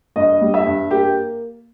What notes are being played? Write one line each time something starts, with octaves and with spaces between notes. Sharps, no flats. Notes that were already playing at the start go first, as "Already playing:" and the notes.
G2 D#5
G3
E5
G2
A#3 G4